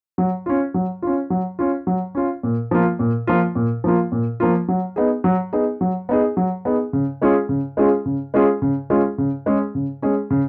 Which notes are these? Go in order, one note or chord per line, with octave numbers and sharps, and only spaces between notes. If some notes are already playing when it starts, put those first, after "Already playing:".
F#3
C#4 F4
F#3
C#4 F4
F#3
C#4 F4
F#3
C#4 F4
A#2
F3 A#3 F4
A#2
F3 A#3 F4
A#2
F3 A#3 F4
A#2
F3 A#3 F4
F#3
B3 D#4 G#4
F#3
B3 D#4 G#4
F#3
B3 D#4 G#4
F#3
B3 D#4 G#4
C#3
G#3 C#4 F4 G#4
C#3
G#3 C#4 F4 G#4
C#3
G#3 C#4 F4 G#4
C#3
G#3 C#4 F4 G#4
C#3
G#3 C#4 G#4
C#3
G#3 C#4 G#4
C#3